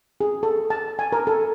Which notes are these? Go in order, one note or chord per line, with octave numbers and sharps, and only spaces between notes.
G#4
A4
A5
G#5
A#4
A4